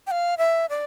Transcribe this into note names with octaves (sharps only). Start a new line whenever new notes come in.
G5
F5
E5
D5